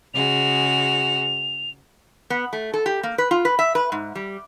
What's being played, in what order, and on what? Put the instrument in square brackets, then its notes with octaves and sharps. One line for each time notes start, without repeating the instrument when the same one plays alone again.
[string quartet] C#3 G#3 F#4 [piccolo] F7
[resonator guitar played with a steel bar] B3
A3
A4
G4
A#3
B4
F4
B4
E5
B4
G#2
G3